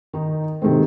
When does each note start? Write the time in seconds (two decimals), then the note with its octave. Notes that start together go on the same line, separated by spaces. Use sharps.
0.13 D#3 D#4
0.62 C3 D#3 G#3 A3 C4